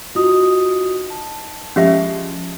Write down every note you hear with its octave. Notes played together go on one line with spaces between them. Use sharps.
D#4 F4 F#4 D#6
A5
F3 G#3 C#4 G4 E5